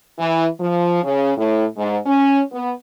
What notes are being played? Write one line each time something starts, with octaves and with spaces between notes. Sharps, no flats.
E3
F3
C#3
A2
G#2
C#4
B3